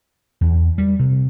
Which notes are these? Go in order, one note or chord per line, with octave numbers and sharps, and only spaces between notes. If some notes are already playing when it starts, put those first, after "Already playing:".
E2
G3
C3